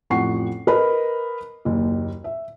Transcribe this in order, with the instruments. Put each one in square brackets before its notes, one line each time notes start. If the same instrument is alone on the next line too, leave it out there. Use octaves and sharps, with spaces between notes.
[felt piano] A1 F2 F#5 C#6 C7
A#4 B4 D#5 B5
F#1 D#2
E5